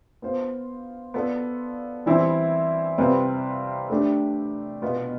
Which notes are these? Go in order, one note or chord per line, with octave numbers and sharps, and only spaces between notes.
B3 F4 C5
B3 F4 A4 D5
E3 G3 C4 E4
C3 G3 C4 F4 B4
A3 D4 G4
B2 B3 F4 B4